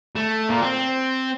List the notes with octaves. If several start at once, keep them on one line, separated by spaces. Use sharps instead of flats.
A3
A#2
C4